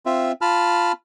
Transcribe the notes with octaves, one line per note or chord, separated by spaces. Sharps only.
C4 F4 E5
F4 A5 B5 F6